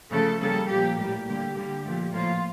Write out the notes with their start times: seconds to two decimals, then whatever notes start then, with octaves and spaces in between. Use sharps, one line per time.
0.11 C#3 F3 A3 A4
0.39 C#3 G3 A#3 A4
0.68 A#2 F3 A#3 G4
0.97 A2 G3 A#3 G4
1.26 D3 G3 A#3 G4
1.54 D3 G3 A#3 G4
1.83 A#2 F3 A3
2.12 A2 F3 A#3 F4